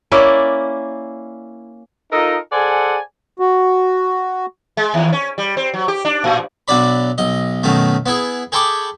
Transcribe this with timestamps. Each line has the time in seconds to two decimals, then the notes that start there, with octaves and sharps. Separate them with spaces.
0.11 A#3 C#4 E4 D5
2.12 D#4 F4 A4 A#4 D#5
2.52 G#4 A4 C5 D5 F#5 G#5
3.39 F#4
4.77 G#3
4.94 D#2
5.12 C#4
5.38 G3
5.57 C4
5.74 F#3
5.88 G4
6.05 D4
6.24 A2
6.68 B1 F#3 D4 D5 B5
7.18 B1 D#5
7.63 F#2 B2 D#3 A3
8.06 B3 E4 G#4
8.52 G#4 A4 G5 B5 C#6 D6